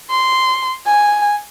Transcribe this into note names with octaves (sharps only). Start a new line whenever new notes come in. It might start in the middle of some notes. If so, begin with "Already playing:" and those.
C6
G#5